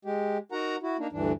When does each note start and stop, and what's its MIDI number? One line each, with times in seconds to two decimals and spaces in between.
0.05 0.38 56
0.05 0.38 67
0.52 0.76 63
0.52 0.76 66
0.52 0.76 70
0.52 0.76 78
0.52 0.76 82
0.83 0.97 64
0.83 0.97 66
0.99 1.07 58
0.99 1.07 62
0.99 1.07 63
1.12 1.32 38
1.12 1.32 43
1.12 1.32 52
1.12 1.32 62